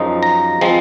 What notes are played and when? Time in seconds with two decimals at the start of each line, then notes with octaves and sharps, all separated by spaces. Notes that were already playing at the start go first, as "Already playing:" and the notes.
Already playing: F#2 F3 G#3 D#4
0.23 A#5
0.61 F3 G#3 C4